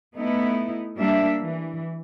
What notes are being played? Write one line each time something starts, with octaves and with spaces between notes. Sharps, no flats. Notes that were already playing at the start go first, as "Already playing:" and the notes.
A3 B3 D#4 E4
G3 A#3 D4 E5
E3